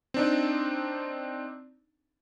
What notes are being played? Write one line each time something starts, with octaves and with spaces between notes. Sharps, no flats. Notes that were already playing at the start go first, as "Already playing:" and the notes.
C4 D4 D#4